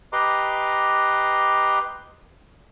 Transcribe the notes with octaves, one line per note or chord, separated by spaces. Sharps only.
G4 B4 D#5 A#5 C6 D6